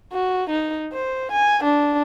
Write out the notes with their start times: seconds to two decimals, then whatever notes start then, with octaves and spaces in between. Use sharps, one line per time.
0.13 F#4
0.50 D#4
0.93 C5
1.32 G#5
1.64 D4